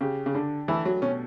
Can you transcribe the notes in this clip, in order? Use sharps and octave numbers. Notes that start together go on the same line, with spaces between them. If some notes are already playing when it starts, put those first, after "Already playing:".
C#3 G4
C#3
D3 D4
E3 A3
F#3
B2 C#4